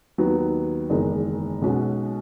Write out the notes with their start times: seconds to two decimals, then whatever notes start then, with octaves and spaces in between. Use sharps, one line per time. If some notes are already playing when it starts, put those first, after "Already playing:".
0.18 D#2 D#3 F#3 B3
0.90 F#1 E2 D#3 G#3
1.62 B1 B2 G#3 C#4 F#4